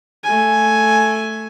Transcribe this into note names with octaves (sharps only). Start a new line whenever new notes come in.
A3 G#5